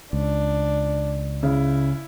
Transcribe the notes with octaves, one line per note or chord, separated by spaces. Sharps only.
C#2 D4
C#3 E4